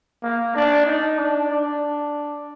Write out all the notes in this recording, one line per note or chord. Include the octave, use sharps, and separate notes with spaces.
A#3
D4
D#4
D4
D4